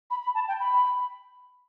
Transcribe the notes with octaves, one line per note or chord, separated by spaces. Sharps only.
B5
B5
A5
G5
B5